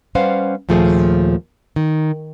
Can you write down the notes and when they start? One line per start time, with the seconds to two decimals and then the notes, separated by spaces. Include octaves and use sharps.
0.15 G3 C#4 B4 C5 F5 F#5
0.69 D#2 A#2 F3 A3 G#4
1.76 D#3